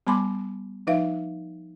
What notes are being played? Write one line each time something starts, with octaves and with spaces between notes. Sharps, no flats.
G3 B3 G#5 B5 C6 D6
F3 D#4 B4 E5 F5